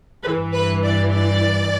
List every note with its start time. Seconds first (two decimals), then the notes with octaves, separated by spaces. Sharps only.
0.24 G2 E3 B4
0.53 B4
0.83 D5
1.11 D5